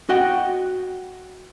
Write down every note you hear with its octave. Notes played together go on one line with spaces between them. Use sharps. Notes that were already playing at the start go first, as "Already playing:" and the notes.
F#4 D#5 F#5 G5